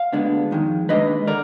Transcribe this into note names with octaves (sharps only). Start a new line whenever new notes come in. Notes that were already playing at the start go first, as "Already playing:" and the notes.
Already playing: F5
D2 D3 G#3 B3 D4
F2 D#3 G#3
D#2 D#3 G#3 D4 B4 D#5
D3 A#4 D5